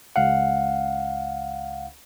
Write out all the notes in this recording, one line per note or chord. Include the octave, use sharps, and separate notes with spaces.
C#2 F5 F#5